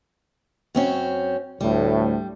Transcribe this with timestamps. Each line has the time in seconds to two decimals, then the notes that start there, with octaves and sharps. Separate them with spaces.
0.75 F#2 C4 C#4
1.61 D2 A2 G3